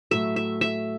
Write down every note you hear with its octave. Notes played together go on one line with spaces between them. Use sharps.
A2 F#3 A3 E5
E5
E5